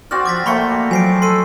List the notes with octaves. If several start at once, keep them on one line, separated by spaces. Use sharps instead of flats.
C4 F#4 D5 F6
F3 D6 A6 B6
A3 A#3 C4 B5 C#6 C#7
F3 F#3 G#5 C7 D7
A4 C6 C7 D#7